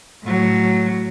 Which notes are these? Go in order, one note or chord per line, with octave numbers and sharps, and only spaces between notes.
A2 F#3